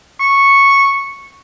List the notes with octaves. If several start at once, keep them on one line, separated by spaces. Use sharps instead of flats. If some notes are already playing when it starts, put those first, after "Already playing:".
C#6